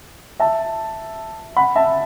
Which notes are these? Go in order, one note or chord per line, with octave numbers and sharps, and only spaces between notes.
E5 A5
F#5 B5
E5 A5